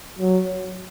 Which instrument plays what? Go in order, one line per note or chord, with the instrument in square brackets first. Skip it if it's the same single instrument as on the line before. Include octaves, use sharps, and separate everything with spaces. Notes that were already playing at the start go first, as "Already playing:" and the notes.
[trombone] F#3